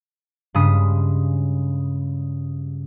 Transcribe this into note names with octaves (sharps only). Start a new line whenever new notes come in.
G2 C#3 G#3 D#6 B6